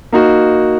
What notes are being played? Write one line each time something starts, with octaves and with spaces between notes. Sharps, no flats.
A#3 D#4 F#4